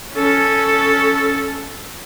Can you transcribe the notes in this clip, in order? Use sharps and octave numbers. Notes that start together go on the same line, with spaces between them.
C#4 A4